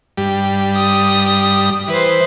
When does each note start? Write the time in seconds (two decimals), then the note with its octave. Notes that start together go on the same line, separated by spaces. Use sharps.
0.18 G2 G3
0.77 D#6
1.88 E3 B4 C5